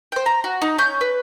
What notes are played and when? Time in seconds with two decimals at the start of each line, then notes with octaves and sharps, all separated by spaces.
0.12 C5 G5
0.26 A#5
0.44 F#4
0.62 D#4
0.78 C#4 G6
1.01 B4